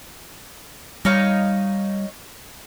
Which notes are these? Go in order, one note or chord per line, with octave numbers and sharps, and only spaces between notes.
G3 D#4 C#5 F5